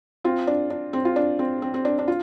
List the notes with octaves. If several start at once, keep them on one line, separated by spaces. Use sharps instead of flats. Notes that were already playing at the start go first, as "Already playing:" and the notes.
C4 F4
D4
D4
C4
F4
D4
C4
C4
C4
D4
D4
F4